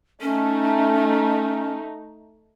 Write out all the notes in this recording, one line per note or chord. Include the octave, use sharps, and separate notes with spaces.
A3 C#4 D#4